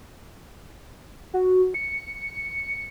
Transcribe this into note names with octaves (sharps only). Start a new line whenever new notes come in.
F#4
C#7